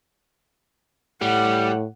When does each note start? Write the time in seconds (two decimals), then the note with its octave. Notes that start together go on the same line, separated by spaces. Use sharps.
1.21 A2 G3 F#5